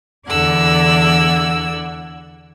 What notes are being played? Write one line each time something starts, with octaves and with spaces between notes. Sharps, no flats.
E2 D3 D5 F#5 E6 G#6